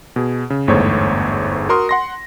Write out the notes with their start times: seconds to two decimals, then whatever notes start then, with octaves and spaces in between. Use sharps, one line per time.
0.16 B2 G#4
0.50 C#3
0.68 G1 E2 G#2 A3 C5 C#5
1.69 F#4 A#4 C6 D#6
1.89 F#5 C6 A#6